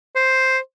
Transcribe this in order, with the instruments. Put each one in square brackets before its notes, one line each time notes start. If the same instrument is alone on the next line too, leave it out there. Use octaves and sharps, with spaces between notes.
[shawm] C5